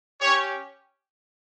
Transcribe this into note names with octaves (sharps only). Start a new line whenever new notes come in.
C#4 G4 C#5